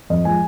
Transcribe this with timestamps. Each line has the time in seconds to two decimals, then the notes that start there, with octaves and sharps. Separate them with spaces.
0.10 F2 D#5
0.25 F3 G#3 G#5